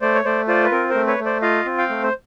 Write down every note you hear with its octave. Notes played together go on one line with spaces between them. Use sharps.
A3 C5 D5
C#5
A3 C5 D5
F4 C5 D5
B4
C4 A#4
A#4 C5
A3
B4 C#5
A3
C5 D5
F4 D#5 F5
C4
F5 G5
A3
C5